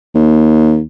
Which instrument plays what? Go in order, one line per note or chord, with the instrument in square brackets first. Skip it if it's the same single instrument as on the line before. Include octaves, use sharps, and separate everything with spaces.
[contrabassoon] D#2